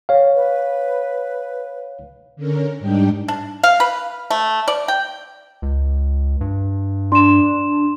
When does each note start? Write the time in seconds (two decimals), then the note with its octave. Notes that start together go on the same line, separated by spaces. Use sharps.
0.09 C#5 F5
0.35 B4
2.36 D3 C#4 A#4
2.79 G#2 G3 D4 D#4 G5
3.28 D4
3.64 F5
3.80 B4
4.30 A3
4.68 D5
4.88 G5
5.62 C#2
6.41 G2
7.12 D4 C6 E7